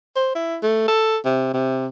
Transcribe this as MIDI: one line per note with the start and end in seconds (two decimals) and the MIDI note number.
0.16 0.30 72
0.35 0.57 64
0.63 0.86 57
0.88 1.17 69
1.25 1.51 48
1.54 1.87 48